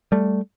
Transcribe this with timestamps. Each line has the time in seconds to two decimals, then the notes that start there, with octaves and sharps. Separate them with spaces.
0.12 G3 A3